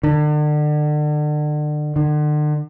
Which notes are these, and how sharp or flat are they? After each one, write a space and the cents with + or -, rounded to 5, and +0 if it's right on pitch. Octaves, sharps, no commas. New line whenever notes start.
D3 +35
D3 +40